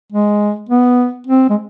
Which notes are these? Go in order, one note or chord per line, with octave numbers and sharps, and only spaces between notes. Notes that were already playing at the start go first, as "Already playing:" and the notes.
G#3
B3
C4
G#3